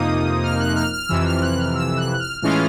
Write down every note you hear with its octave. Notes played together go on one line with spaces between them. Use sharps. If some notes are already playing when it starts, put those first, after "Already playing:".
Already playing: F2 C3 F3 A#3 D#4 D#6
F6
F#6
F6
F6
F2 C3 E3 E6
F6
F#6
F6
E6
F#6
F6
A2 E3 G#3 C#4 F4 F6